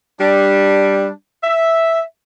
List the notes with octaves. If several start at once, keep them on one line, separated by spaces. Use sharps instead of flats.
G3 D4
E5